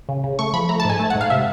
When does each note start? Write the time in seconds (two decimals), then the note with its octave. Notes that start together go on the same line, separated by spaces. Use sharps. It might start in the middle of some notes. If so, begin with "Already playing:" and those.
0.09 C#3
0.24 C#3
0.39 A3 C#6
0.54 F3 B5
0.69 A3 A#5
0.80 A5
0.85 G#2 G#5
0.99 A3 A5
1.10 F#5
1.15 G#2
1.21 F5
1.30 C3 E5